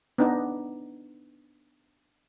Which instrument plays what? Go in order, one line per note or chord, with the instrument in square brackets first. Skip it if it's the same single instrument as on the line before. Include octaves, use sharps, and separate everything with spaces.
[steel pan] B3 D4 D#4